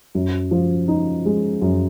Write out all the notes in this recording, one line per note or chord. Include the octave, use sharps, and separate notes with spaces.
F#2
F3
D#4
G#3
F#2